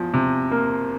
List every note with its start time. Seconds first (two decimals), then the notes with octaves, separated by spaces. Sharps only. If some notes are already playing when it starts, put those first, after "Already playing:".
Already playing: E2 F3
0.14 C3
0.51 A#3